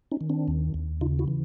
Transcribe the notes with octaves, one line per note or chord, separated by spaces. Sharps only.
C#4 D#4
D#3
C4 D4
D#2
D#2
C#3 D#4 F4
E4 F#4
E3